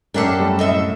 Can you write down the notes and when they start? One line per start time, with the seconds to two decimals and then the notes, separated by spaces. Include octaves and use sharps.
0.14 F#2 C#4 D4 G4 A4 A#4
0.39 G3 A3
0.59 C2 A2 A4 D#5 E5